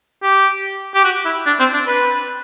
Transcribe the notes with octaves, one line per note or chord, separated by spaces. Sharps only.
G4
G4
F#4
E4
D4
C4
D4
B4